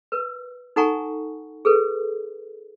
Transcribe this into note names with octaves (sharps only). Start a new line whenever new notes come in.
A#4 B4
D#4 A4 F#5 G#5 A#5 C#6
G#4 A4 B4